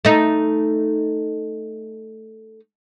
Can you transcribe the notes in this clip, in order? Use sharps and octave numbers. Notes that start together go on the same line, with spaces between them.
A3 D#4